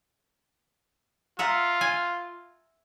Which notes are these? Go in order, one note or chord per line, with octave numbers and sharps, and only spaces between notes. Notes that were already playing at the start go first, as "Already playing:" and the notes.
F4 E5 F#5 A#5
G#5